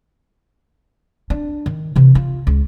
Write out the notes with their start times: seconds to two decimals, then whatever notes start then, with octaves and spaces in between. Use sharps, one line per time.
1.30 D4
1.66 D#3
1.96 C3 E3
2.15 F4
2.47 C#2